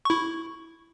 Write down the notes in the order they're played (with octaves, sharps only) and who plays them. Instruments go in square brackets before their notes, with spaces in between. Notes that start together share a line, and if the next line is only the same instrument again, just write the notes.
[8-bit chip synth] E4 C#6